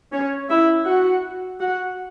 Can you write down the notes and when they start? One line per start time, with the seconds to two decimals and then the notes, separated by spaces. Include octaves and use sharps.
0.12 C#4 C#5
0.50 E4 E5
0.86 F#4 F#5
1.60 F#4 F#5